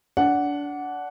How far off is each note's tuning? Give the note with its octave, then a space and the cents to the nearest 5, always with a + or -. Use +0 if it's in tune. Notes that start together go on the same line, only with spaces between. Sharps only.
D4 -25 F#5 +0